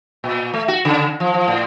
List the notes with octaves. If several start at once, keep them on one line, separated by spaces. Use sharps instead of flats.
A#2
A3
F#4
C#3
F3
F3
A2